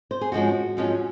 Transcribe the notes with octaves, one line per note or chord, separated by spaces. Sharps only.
C5
G#4
G#2 F3 G#3 C#4 F#4
G#2 F3 G#3 C#4